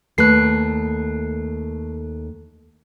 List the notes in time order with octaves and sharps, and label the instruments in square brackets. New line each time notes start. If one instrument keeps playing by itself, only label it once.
[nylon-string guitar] D#2 A3 B4 [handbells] F#6 C7